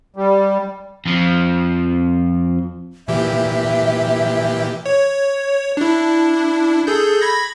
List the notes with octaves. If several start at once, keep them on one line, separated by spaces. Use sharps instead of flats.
G3
F2 F3
A#2 E3 G4 E5
C#5
D4 E4
G#4 A4 G6
B5 G#6 A#6